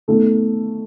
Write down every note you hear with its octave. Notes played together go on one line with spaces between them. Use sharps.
B2 A3 D#4 A4